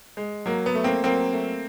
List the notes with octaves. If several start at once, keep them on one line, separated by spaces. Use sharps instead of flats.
G#3
F#3 A#3
B3
A3
A#3 C4
F#3 A#3 C4
A3